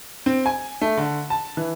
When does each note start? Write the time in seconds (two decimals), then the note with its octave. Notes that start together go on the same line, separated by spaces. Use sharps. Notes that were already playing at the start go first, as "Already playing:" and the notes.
0.26 C4
0.46 G#5
0.81 A3
0.97 D3
1.30 A5
1.57 E3